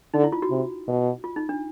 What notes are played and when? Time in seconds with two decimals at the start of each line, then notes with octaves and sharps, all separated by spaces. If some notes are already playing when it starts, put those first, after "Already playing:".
0.14 D3 D#4
0.24 E4
0.32 F4
0.42 F#4
0.50 C3
0.87 B2
1.24 F4
1.36 D#4
1.49 D4